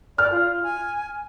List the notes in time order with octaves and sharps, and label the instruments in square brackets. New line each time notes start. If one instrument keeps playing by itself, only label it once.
[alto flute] D5 [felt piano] F6
[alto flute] F4
G#5